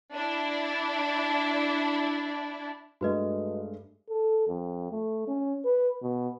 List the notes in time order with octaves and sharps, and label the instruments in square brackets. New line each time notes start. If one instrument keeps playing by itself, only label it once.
[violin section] D4 E4
[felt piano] G2 G#3 A3 [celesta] F#4 B4 D#5
[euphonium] A4
F2
A3
C#4
B4
B2